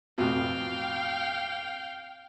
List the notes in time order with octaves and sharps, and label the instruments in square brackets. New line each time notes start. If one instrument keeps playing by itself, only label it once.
[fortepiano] A1 F2 B2 [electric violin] F5 G5